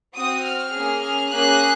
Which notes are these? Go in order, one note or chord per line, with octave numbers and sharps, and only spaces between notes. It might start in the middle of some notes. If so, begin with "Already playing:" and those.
C4 F#4 D#6
F6
A#3 C#4 G#4
A#3 C#4 G#4 F#6